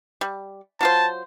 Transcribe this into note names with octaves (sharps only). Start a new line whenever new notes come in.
G3
F#3 F4 C5 A5